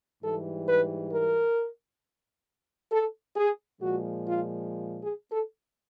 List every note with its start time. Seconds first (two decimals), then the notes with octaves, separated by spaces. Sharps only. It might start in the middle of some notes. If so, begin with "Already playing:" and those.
0.22 G#2 E3 G3 A4
0.67 B4
1.13 A#4
2.92 A4
3.36 G#4
3.82 A#2 F3 G#3 F#4
4.27 F4
5.02 G#4
5.32 A4